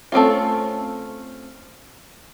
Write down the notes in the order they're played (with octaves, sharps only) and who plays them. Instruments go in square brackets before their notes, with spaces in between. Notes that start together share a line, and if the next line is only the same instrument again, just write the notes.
[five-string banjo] A3 C4 C#4 F4